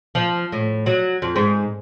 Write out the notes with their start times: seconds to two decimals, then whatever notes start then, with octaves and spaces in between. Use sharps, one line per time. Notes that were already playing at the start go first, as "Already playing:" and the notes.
0.15 F3
0.52 A2
0.86 F#3
1.22 F2
1.36 G#2